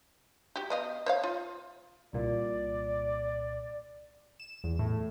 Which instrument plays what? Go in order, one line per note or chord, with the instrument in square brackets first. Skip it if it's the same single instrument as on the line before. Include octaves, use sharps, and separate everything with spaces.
[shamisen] F#4 G4
B3 D#5 F5
C5 C#5 F5
F4
[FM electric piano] C2 A#2 [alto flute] D5
[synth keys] E7
E2
A2